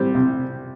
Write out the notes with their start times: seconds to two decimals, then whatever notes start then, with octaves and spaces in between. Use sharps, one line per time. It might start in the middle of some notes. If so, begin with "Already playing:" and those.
Already playing: G3 C4 G4
0.15 C3